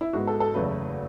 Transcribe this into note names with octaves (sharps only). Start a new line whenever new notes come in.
E4
G#2 G#3 B3 F#4
A4
A4
F#1 E2 C#3 F#3 A3 B4